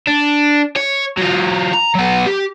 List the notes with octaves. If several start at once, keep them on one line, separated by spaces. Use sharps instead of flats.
D4
C#5
F#3 F4
A#5
F#3 B3
G4